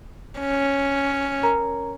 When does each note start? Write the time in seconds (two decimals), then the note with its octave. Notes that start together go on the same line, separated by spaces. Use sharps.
0.40 C#4
1.43 A#4 A#5